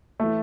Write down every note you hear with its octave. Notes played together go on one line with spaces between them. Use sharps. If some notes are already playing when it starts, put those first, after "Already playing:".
E3 A3